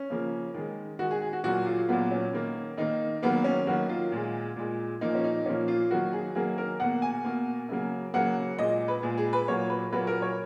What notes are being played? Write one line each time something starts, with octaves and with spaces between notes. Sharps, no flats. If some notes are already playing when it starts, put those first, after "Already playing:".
Already playing: C#4
C#3 F3 A#3
D#3 G#3
D#3 G#3 F#4
G#4
G#4
F#4
A#2 F#3 A#3 F#4
F4
A#2 F#3 A#3 B3
C#4
D#3 A#3
D#3 A#3 D#4
D#3 F#3 A#3 B3
C#4
D#3 F#3 A#3 F#4
F4
A#2 G#3
A#2 G#3
A#2 F3 A#3 D#4
C#4
D#4
A#2 F3 A#3 C#4
F4
D#3 F#3 A#3 F#4
G#4
D#3 F#3 A#3 G#4
A#4
B2 A#3 F#5
G#5
B2 A#3
C#3 F#3 A#3
C#3 F#3 A#3 F#5
A#2 G#3 D#5
B4
A#2 G#3 G#4
G#4
B4
A#2 F#3 A#3 C#5
B4
A#2 F#3 A#3 B4
A#4
C#5